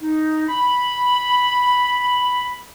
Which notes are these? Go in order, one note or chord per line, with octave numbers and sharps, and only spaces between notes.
D#4
B5